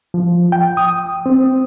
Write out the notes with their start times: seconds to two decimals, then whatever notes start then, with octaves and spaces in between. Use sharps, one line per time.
0.14 F3
0.52 G5
0.77 D#6
1.26 C4